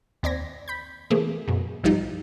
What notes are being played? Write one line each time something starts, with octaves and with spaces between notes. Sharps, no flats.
D#2 C4 D5 G#6 A#6
B5 G6
C3 E3 A3 A#3 G#4
F#2 B2
B1 G#2 F3 G3 D#4